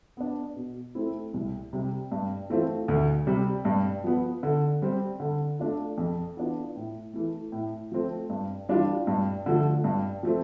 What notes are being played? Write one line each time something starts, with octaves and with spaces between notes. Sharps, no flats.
B3 D4
B2
A3 C4 E4
C2
C3 G3
G2
E3 A3 C4 F4
D2
C3 G3
G2
F3 B3
D3
G3 C4
D3
A3 D4 F4
F2
E3 B3 D4 F4
A2
E3 A3
A2
F3 A3 C4
G2
E3 G3 D4 F4
G2
D3 F3 A3
G2
F3 A3 C4